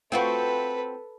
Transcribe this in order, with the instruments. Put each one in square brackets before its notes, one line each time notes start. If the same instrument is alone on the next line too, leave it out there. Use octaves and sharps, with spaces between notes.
[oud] C4 F4 F#4 [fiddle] A4 B4